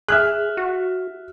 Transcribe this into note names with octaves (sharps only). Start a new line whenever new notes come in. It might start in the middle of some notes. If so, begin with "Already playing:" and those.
G#4 E5 F6 F#6
F#4